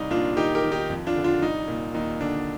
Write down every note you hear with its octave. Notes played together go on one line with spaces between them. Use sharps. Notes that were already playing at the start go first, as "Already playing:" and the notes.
Already playing: C2 D#4
A#2 D4 F4
D#3 D#4 G4
G4 A#4
D#3
D#4 G4
F2
D4 F4
D3
D4 F4
C2 D#4
A#2
D#2 D#4
D3 D4